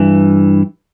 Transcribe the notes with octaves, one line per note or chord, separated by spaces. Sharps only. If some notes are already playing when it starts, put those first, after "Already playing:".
Already playing: G2 E3